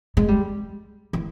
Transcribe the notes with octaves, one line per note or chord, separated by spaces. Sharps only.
G#3
G3
E3